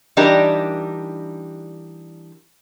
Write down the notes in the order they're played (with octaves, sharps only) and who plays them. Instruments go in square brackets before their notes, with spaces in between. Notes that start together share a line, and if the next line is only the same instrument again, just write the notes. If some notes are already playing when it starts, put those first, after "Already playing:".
[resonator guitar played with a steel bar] E3 G3 D4 D#4 G4 A#4